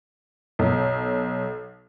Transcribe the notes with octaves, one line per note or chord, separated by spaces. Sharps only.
B1